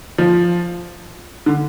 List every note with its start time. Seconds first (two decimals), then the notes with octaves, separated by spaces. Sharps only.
0.18 F3
1.46 D3